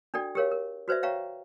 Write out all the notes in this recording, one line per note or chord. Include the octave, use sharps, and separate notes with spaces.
D4 F#4 A4 D5 G5
G4 G#4 A#4 C#5 F5
A#4
F#4 B4 C5 D5 E5
C#5 E5 F5 G5 A#5 C#6